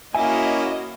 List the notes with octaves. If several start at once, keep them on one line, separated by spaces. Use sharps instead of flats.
A#3 C#4 E4 F#4 D#5 E5 G#5